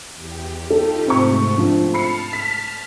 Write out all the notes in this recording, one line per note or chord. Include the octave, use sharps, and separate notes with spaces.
E2 G4
D#4 F4 G4 A4
G#2 C3 A3 C4 C#6
F3 D4
A5 B5 F6 C7 C#7
B6